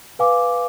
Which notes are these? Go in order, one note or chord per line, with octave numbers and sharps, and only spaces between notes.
B4 F5 G#5 D6